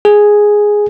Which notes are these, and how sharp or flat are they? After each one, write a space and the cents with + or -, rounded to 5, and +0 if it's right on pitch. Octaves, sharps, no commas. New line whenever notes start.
G#4 +0